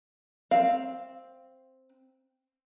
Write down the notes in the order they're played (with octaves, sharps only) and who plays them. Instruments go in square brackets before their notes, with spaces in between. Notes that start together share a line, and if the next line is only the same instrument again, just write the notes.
[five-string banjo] C4 F5